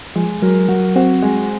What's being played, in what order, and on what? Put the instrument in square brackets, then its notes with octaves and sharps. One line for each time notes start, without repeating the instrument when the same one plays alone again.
[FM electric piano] F3 [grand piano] G#3
[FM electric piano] F#3 [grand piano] A#4
[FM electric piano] F#3 [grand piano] F#4
[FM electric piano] C4 [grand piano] F#4
[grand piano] G#3